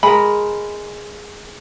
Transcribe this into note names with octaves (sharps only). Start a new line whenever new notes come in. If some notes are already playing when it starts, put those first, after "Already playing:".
G#3 A#4 B5